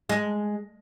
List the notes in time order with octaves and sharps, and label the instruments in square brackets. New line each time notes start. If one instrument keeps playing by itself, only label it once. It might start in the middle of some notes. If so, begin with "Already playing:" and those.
[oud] G#3